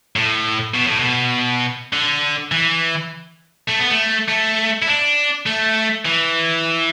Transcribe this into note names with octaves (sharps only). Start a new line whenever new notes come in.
A2
B2
A2
B2
D3
E3
A3
B3
A3
A3
E4
D4
A3
E3